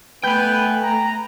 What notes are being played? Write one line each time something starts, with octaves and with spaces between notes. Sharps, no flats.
A3 B3 B4 G5 G#5 B5 G6
A#5